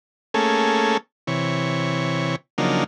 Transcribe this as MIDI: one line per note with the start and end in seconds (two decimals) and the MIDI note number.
0.34 0.97 57
0.34 0.97 58
0.34 0.97 61
0.34 0.97 68
0.34 0.97 69
1.27 2.36 48
1.27 2.36 52
1.27 2.36 73
2.58 2.84 49
2.58 2.84 53
2.58 2.84 54
2.58 2.84 58
2.58 2.84 62
2.58 2.84 63